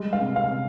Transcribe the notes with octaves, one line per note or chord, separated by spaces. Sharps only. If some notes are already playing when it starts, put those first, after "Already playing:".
Already playing: G3 G#3
F5
C3
F5
C3